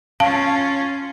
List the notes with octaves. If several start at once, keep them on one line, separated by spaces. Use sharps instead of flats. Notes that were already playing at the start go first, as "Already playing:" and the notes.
C#4 F4 F5 A5